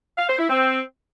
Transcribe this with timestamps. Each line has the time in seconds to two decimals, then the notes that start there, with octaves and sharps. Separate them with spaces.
0.18 F5
0.28 C5
0.39 E4
0.49 C4